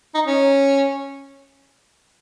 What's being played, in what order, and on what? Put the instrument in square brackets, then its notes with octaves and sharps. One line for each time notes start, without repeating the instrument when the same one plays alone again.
[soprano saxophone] D#4
C#4